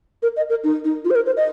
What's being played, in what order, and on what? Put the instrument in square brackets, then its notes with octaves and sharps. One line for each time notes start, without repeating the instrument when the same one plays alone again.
[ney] A#4
D#5
A#4
D#4
D#4
F4
C5
A#4
C5
D#5